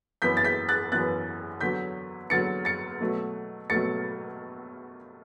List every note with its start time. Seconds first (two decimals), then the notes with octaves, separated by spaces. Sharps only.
0.22 F#2 E3 B3 G6 B6
0.37 A6
0.45 G6 B6
0.69 F#6 A6
0.92 F#2 E3 B3 F#6 A6
1.61 E2 D3 F#3 G6 B6
2.30 E2 D3 F#3 A6 C#7
2.65 A6 C#7
3.01 B2 F#3 A3
3.70 B2 F#3 A3 A6 C#7